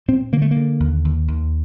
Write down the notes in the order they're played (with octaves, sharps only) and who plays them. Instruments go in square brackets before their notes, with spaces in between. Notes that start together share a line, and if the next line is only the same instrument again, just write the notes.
[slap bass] A#2 C4
D3 A#3
A3
A#3
D3
D#2
D#2
D#2